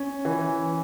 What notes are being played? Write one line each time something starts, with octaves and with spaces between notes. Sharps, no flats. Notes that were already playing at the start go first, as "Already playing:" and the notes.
Already playing: C#4
E3